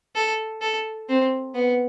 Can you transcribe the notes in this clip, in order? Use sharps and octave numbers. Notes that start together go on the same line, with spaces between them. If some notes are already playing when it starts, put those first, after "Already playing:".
A4
A4
C4
B3